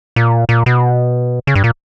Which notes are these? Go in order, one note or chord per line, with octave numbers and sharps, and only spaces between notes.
A#2
A#2
B2
C#3
G2
A#2